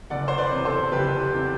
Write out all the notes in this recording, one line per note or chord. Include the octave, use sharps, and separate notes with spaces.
F#1 D5 F#5
C5
B4 D5
E2 C3
A4 C5
F#1 G4 B4
E2 C3